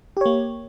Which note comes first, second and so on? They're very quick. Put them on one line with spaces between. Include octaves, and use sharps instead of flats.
G4 C#5 A#3